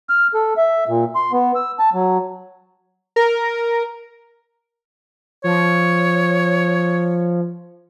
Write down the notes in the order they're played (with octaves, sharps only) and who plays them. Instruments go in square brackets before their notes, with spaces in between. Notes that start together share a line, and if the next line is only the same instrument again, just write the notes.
[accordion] F6
A4
E5
A#2
C6
B3
E6
A5
F#3
[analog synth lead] A#4
[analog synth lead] F3 [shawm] C#5